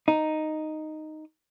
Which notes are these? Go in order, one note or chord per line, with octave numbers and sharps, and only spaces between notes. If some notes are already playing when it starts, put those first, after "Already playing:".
D#4